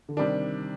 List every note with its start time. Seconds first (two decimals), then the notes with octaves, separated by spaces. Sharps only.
0.09 D3
0.17 C3 D#3 G3 D4